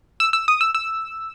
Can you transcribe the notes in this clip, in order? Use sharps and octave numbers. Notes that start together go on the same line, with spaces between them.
E6
E6
D#6
E6
E6